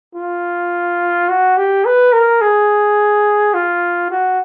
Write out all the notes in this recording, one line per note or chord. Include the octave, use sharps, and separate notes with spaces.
F4
F#4
G4
B4
A#4
G#4
F4
F#4